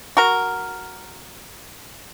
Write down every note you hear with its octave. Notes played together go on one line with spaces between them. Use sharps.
F#4 A#4